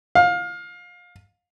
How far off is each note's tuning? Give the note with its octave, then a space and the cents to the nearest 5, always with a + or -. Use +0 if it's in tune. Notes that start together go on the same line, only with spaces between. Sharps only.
F5 +25